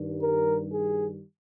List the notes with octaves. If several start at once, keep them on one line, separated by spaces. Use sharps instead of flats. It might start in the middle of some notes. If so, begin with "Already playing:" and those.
Already playing: G2 D#3 G3
A#4
G#4